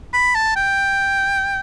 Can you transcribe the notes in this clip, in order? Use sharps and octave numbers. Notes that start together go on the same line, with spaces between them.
B5
A5
G5